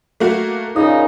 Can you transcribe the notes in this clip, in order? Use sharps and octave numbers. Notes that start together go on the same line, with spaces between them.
A3 A#3 F#4
A#2 C#3 D#4 D#6